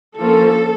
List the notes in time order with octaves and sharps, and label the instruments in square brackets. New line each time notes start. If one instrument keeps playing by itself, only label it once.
[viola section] D3 F3 A#3 C#4 A4